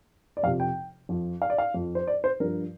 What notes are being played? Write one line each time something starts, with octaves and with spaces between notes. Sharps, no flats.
D5
F2 C3 F3 F5
G5
F2 F3
F5
D5
F5
F2 F3
C5
D5
C5
G2 F3 A#4